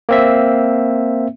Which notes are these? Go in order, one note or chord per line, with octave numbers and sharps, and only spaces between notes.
A#3 C4 E5